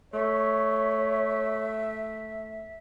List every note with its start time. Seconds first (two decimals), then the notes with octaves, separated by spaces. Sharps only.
0.14 A3 C#5 E5